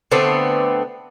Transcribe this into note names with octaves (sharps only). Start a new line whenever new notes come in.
D3 A3 B3 C4